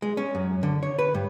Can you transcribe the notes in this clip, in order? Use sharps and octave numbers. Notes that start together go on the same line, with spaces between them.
G#3
C#4
F#2
D3
C#5
B4
G2